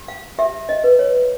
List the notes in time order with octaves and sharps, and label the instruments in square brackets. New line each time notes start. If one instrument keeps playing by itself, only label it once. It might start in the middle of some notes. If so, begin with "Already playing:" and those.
Already playing: [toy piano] G4
F5
G4 E5
D#5
B4
C#5